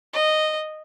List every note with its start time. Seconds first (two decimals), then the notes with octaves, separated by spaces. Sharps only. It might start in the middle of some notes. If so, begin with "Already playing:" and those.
0.13 D#5